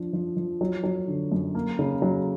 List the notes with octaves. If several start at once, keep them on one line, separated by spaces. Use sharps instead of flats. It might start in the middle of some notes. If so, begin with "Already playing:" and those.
Already playing: F3 D4
F3
F3
F#3
F#3
D3
F#2
A#3
C#3
F#3